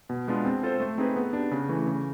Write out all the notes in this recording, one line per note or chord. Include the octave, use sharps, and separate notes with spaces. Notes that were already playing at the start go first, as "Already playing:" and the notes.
B2
G#3 B3 D4 F4
C4
F4 A4 C5
A3
C4 D#4 G#4 B4
B3
D4 G4
C#3
E3 A3
C#3